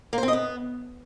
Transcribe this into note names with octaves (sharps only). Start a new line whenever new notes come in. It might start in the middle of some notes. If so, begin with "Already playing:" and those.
A#3
C5
C4
D#5
B3